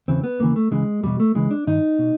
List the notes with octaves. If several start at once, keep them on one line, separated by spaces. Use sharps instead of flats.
E2 C#3 E3 C4
B3
D#2 C#3 E3 A#3
A3
C#2 C#3 E3 G#3
E2 B2 G3
A3
C#2 C#3 E3 G#3
D4
G2 D#3 D#4
B2